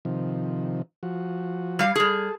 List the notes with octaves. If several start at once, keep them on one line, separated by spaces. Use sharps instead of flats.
C3 D#3 F3
F3 F#4
G3 F5
G3 G#4 A4